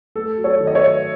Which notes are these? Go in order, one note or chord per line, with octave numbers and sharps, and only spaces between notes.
A3 A4
F#3
A4 C#5
D#3
D#5
C#5 E5
F#3